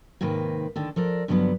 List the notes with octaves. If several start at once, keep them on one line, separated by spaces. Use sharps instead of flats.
G#2 C3 D#3 A#3 B4
D#2 D3 D#3 A4
F3 A4 A#4 D5
G2 D3 F3 F#3 B3